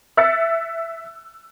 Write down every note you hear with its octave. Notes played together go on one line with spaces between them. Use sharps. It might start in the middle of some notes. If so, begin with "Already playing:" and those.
E5 E6 F#6 A6 C#7